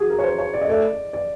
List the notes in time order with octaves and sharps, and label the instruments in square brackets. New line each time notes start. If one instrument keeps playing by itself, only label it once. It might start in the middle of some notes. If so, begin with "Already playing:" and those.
Already playing: [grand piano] F#4 G#4
A#4
C#5
C5
C#5
D5
D#5
[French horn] A3 [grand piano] D5
[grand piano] D5